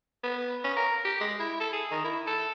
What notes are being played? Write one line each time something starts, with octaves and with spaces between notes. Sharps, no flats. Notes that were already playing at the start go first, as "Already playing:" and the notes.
B3
C#4
A#4
G4
G#3
E4
A4
G#4
D#3
E4
A4